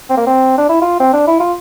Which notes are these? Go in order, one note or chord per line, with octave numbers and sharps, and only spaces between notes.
C4
A#3
C4
D4
E4
F4
C4
D4
E4
F4